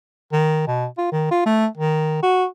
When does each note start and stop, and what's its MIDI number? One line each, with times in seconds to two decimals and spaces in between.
0.32 0.64 51
0.67 0.86 47
0.98 1.09 65
1.12 1.29 51
1.31 1.44 65
1.46 1.66 57
1.77 2.22 51
2.23 2.45 66